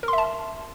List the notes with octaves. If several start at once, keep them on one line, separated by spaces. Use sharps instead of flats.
A#4
C6
E5
A5